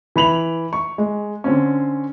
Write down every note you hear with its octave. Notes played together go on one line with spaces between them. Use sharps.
E3 B5 F7 F#7
C#6
G#3
D3 C4 C#4